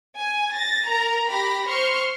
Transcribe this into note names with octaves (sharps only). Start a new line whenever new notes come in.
G#5
A6 A#6
A#4 A#5
G4 B5 A#6
C5 C6 C#6 F6